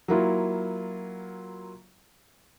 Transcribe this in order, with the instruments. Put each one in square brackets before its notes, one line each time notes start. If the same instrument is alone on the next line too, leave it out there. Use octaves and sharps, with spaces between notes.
[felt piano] F#3 A#3 E4 F4